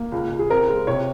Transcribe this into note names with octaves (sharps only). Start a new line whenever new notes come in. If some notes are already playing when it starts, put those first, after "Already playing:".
Already playing: A#3
C#2
C#2
G#4
C4 A#4
G#3
C3 C#5